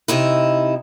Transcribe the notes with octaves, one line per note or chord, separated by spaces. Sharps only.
C3 D#4 E4